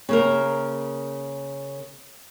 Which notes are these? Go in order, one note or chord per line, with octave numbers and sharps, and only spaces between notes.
C#3 A#3 A#4